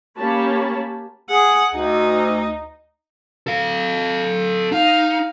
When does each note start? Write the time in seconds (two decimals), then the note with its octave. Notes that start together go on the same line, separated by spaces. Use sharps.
0.17 A#3 C#4 G4 C#5 A5 B5
1.30 G#4 F#5
1.74 D2 D#4
3.47 A4 F5
4.72 D#4 F5